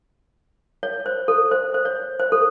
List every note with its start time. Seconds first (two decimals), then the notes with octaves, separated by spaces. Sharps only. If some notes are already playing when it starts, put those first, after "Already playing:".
0.83 C#5
1.06 C5
1.28 A4
1.51 C5
1.74 C5
1.85 C#5
2.19 C5
2.32 A4